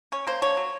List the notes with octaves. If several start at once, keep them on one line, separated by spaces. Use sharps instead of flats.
C#4 C#5
A#3 C5
D3 C#5
F#3